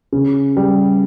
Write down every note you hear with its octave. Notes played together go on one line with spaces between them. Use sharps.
C#3
G3